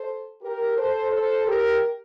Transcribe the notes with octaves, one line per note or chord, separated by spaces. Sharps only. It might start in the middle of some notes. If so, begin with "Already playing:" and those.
Already playing: A4 C5
G4 A#4
A4 C5
A4 C5
G4 A#4